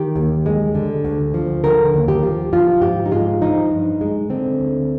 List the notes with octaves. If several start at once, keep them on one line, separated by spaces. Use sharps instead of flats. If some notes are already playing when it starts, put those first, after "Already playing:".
Already playing: D#3 G4
D#2
G#3
D3
D2
F3
D3 A#4
D#2
G4
F3
F3 F4
G#2 G4
D#4
G#3 F4
F3 D#4
G2
G#3
D3 C4
D2